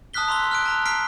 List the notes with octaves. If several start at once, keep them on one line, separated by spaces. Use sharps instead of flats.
A5 D#6 F6 F#6 B6 G7
A#5 C6 E6 G7
F6 F#6 D7
A5 A#5
F6 B6 C7 D7 G7